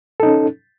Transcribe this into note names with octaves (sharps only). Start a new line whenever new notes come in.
C#4 D#4 A4